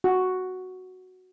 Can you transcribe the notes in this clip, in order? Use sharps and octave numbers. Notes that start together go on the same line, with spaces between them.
F#4